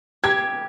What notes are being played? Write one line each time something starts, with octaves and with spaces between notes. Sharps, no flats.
G4 G#6